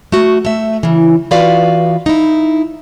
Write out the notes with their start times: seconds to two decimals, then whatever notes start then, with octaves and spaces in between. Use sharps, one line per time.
0.12 A3 F#4
0.45 A3 E5
0.83 C#3 E3
1.31 E3 F4 F#4 B4 D5 F5
2.06 D#4 E4